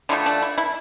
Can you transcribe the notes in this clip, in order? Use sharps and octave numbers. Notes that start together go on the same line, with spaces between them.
D3 F3 A3 E4
D4
E4
E4